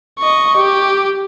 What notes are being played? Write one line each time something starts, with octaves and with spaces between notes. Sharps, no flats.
D#5 C#6
G4